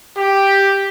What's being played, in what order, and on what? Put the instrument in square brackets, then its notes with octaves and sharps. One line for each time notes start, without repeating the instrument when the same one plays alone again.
[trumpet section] G4